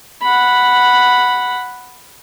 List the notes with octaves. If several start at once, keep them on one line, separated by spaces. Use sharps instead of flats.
F#5 B5